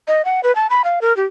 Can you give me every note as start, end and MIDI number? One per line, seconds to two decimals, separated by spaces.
0.08 0.24 75
0.25 0.41 78
0.43 0.54 71
0.55 0.67 81
0.70 0.82 83
0.84 0.99 77
1.01 1.15 70
1.17 1.25 67